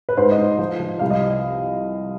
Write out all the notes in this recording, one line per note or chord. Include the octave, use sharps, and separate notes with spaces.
B4
G#2 C5
D#5
G#2
F3
F3
C2 F5
D#5